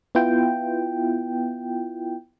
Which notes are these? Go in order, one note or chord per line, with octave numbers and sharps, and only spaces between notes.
B3 E4 F4 G5